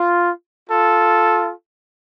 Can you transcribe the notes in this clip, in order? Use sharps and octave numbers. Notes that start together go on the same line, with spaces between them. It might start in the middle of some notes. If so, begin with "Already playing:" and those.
Already playing: F4
F4 A4